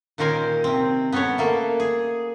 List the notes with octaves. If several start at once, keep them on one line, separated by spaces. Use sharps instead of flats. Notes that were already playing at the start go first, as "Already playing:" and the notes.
A#2 D#3 C#4 A#4 C5 G#5
C3 C4
B3 C#4 A4 B4 C#5
A3 A#3 A4
G#4